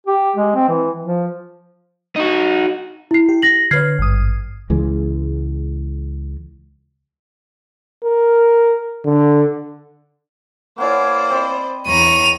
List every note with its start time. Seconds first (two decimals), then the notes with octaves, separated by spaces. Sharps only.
0.07 G4
0.36 G#3
0.55 C4
0.69 E3
1.03 F3
2.16 D#4 F#4
3.11 E4 C7
3.29 G4
3.42 A#6 F#7
3.71 D3 B4 C#5 F6 G#6 C7
3.99 G#1 G2 D#6
4.70 C#2 E3 G#3
8.04 A#4
9.05 D3
10.78 A#3 B3 C#4 E4 C5 D5
11.30 C4 D#5 B5
11.87 E2 C#5 A#5 D#7 F7